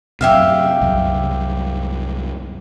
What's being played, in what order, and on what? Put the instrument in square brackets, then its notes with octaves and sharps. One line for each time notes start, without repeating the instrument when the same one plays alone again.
[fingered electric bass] F#2 C3 [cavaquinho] G4 E5 F5
[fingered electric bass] C2 F#2